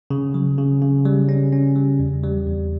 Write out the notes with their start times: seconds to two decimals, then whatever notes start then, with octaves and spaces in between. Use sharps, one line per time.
0.11 C#3
0.34 F#3
0.58 C#3
0.82 C#3
1.05 G3
1.29 C#4
1.53 C#4
1.76 G3
1.99 E2
2.23 G3
2.47 E2